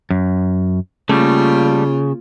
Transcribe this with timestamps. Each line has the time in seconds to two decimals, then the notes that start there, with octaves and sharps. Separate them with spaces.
0.10 F#2
1.09 C#3 G3 A3 A#3 F4